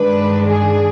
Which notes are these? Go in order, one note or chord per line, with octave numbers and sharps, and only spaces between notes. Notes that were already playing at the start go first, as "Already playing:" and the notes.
Already playing: G2 D#3 G#3 D4 B4
G#4